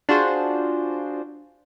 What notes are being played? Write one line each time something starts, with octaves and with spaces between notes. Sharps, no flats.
D4 F4 F#4 G#4 C5